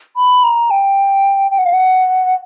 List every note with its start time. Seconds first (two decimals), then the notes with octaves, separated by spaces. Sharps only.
0.17 B5
0.44 A#5
0.71 G5
1.51 G5
1.58 F#5
1.66 F5
1.73 F#5